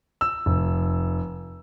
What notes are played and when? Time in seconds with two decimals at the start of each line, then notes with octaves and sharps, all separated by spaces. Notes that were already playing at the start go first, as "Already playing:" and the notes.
0.21 E6
0.46 F1